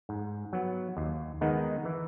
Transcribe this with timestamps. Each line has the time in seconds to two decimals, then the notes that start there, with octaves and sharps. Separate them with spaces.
0.09 G#2
0.53 F#3 B3
0.97 D#2
1.41 D#3 G#3 B3 D#4
1.85 E3